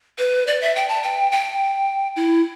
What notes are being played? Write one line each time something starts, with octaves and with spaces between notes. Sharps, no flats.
B4
D5
E5
G5
A5
G5
G5
E4